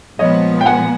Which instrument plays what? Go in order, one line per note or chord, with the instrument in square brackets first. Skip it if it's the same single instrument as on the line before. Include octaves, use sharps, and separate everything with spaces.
[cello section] A#2 F3 G#3 B3 [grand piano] C#5 D#5
[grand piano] G5
F#5 G#5